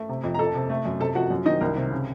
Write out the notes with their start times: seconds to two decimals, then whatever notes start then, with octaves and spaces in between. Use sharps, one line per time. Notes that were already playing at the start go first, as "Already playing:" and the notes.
Already playing: A3
0.09 C3
0.24 F2
0.34 A#5
0.39 F2 A4 A5
0.55 C3
0.70 A3
0.85 F#2
1.00 C3 A4 A5
1.15 F3 F#4 F#5
1.30 F#2
1.45 D#3 D#4 D#5
1.61 C2 A#4
1.77 C3
1.91 C#3